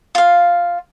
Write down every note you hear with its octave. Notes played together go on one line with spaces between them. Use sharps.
F4 F5